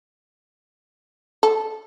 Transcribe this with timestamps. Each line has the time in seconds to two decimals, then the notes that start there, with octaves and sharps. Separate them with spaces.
1.43 A4